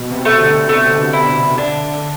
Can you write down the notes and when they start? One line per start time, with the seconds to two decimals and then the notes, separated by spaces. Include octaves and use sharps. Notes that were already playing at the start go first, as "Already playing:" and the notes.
Already playing: B2
0.11 C3
0.25 A3
0.40 D3
0.69 D3 A3
1.13 E4
1.58 D3 D4